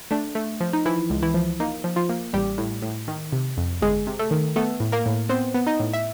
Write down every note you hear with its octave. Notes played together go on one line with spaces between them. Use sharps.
A3 D4
A3
F3
D#4
E3 F3 E4
C#2
E3 E4
F3
A#3 D#4
F3
F3 F4
A#3
A1 G3 G4
A2
A2
D#3
C3
F2
G1 G#3 G#4
C3
A3 A4
D#3
A3 B3 A4
A2
A#3 A#4
A2
B3 C4 C5
B3
D#4 D#5
A2
E5